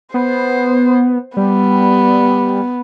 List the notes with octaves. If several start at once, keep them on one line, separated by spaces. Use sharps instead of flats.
B3 C5
G3 B3